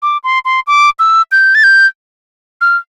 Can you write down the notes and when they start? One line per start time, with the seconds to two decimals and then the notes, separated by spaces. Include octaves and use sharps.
0.02 D6
0.24 C6
0.45 C6
0.67 D6
0.99 E6
1.32 G6
1.55 A6
1.64 G6
2.61 F6